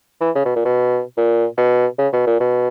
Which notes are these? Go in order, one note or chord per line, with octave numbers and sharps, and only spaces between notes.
E3
C#3
B2
A#2
B2
A#2
B2
C#3
B2
A#2
B2